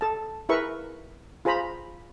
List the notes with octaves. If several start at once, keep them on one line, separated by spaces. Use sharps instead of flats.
A4 A5
E4 G#4 A#4 B4 E5 C#6
F4 G#4 C5 A#5 B5